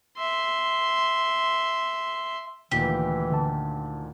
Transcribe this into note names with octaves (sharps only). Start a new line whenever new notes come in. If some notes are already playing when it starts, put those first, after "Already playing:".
E5 C6
D2 A#2 D#3 E3 G4
D3 A5